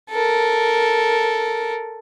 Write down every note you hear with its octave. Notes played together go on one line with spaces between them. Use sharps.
A4 A#4